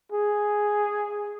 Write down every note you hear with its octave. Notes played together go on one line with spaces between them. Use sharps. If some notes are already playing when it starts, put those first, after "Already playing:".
G#4